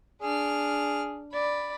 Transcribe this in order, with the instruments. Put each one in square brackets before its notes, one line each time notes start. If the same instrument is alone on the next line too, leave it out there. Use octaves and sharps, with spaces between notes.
[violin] D4 F6 [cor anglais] G#4
[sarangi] D5 [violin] B5